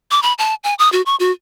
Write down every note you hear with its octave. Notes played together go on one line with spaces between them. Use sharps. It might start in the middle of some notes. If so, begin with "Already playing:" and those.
D6
B5
A5
G#5
D#6
F#4
C#6
F#4